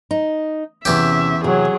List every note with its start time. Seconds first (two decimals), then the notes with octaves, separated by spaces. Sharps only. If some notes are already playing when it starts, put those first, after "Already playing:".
0.11 D#4
0.85 E2 C3 C#4 G4 E5
1.44 C3 F#3 G#4